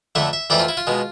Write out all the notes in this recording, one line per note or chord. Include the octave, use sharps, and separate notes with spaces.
F2 D3 A3 E5
E5
F2 E3 A3 C4 D5
F4
E4
F4
B2 G#3